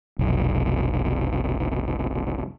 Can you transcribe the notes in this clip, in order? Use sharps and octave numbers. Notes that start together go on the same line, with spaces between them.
F1 B1